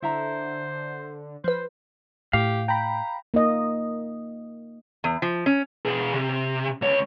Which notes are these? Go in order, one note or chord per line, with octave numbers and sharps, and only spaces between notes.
D3 E4 C5 E5 A#5
F3 B4 C5
A2 G4 F5
G5 A#5 B5
A#3 D#4 D#5
E2
F3
C#4
B2 G#4
C3
C#2 C#5